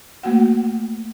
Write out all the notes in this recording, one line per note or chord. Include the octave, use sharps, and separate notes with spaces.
A3 A#3 F#4 F#5